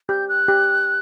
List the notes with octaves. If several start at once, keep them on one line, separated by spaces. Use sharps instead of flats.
G4 G6
F#6
G4